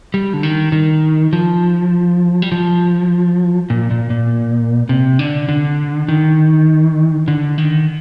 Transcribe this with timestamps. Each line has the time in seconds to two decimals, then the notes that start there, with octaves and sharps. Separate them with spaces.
0.14 G3
0.34 D3
0.43 D#3
0.72 D#3
1.33 F3
2.42 G3
2.52 F3
3.70 A#2
3.91 A#2
4.10 A#2
4.89 C3
5.19 D3
5.49 D3
6.08 D#3
7.28 D3
7.58 D#3